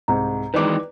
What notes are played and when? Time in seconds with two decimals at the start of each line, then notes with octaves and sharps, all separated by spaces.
0.08 C2 G#2 A#5
0.54 D#3 E3 G#3 B4 D5 D6